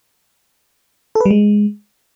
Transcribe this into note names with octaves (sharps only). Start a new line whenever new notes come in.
A4
B4
G3
G#3